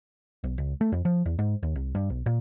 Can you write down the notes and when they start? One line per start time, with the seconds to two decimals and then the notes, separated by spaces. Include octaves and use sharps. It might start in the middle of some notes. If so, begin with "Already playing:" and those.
0.44 B1
0.58 C#2
0.81 A3
0.92 F2
1.05 F3
1.26 E2
1.39 G#2
1.63 D#2
1.76 C2
1.95 G2
2.10 B1
2.26 A#2